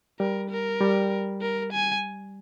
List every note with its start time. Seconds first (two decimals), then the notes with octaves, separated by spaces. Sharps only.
0.19 G3 A#4
0.50 A#4
0.81 G3
1.41 A#4
1.73 G#5